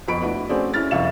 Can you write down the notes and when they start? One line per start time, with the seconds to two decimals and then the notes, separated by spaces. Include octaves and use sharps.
0.08 F2 B3 D#5 B5 C#6 D7
0.22 A3 D4 E4 F#4 B4
0.49 A3 C4 C#4 F#4 G#4 D5
0.74 C#4 E4 F6 A6
0.91 C2 F2 E5 F5 C#6 E7